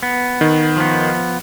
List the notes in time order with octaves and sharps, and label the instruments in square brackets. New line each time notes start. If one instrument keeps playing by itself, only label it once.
[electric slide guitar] B3
[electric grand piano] D#3
[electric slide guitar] F3 B3